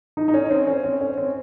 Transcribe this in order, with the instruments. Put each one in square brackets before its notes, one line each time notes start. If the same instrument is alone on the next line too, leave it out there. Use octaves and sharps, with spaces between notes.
[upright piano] D#4
D#4
C#4
C4
C#4
C4
C#4
C4